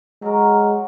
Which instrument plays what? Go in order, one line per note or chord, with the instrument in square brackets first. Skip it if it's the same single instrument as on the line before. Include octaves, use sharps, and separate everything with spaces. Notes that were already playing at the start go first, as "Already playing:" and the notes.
[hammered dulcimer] F#3 A#4 [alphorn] G#3